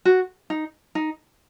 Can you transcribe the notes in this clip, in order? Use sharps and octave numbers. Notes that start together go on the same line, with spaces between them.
F#4
D#4
D#4